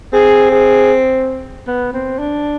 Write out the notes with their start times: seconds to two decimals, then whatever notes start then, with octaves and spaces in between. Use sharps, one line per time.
0.13 C4 G#4
0.52 G#4
1.67 B3
1.93 C4
2.19 D4